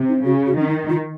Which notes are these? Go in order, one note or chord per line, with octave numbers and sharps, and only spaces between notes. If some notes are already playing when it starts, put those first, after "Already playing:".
Already playing: C3
D#4
C#3 F#4
F#4
D#3 C#4
D#4
F4